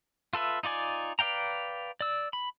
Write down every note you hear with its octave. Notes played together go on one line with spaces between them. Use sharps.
F4 A4 B4 E5
D#4 F4 D5 G#5
B4 D5 F5 G5 A#5
D5 E6
B5